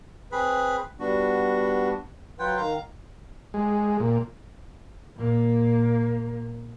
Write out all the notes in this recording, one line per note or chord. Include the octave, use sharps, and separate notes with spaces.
C4 G#4 B4 B5
G3 B3 D4 F#4
F#3 F4 B4 F#5 G5
D#3 F5 A#5
G#3
A#2
A#2 A#3